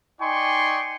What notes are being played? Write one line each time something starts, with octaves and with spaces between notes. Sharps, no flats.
D#4 D5 G5 G#5 C6 C#6